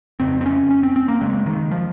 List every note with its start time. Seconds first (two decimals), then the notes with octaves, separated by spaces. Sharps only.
0.20 F2 C#3 C4
0.41 C4
0.46 C#4
0.71 C#4
0.83 C4
0.96 C4
1.08 A#3
1.21 F#2 C#3 G#3
1.46 D#3
1.71 F3